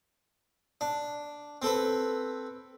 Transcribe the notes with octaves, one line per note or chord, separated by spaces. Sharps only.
D4
C4 A4 B4